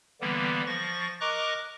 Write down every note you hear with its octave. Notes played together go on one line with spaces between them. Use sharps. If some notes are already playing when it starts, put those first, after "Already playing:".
D3 E3 G3 A#3 B3
F3 C#6 A6 A#6
A#4 D#5 A#5 C#6 D6 F#6